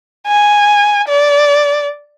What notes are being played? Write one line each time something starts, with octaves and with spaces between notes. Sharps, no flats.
G#5
D5